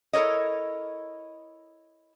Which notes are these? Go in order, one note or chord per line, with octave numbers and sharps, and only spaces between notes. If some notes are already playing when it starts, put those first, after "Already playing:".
E4 A4 A#4 C#5 D#5